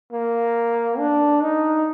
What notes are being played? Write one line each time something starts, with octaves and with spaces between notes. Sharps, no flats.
A#3
D4
D#4